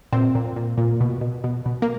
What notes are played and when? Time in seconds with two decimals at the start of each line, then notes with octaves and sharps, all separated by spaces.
0.12 A#2 C4
0.35 A#2
0.56 A#2
0.78 A#2
1.01 B2
1.21 B2
1.44 B2
1.66 B2
1.82 A#3